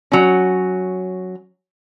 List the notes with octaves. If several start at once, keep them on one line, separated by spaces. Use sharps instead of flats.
F#3 C#4